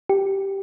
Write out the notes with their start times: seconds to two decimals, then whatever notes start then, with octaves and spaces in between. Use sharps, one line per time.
0.09 G4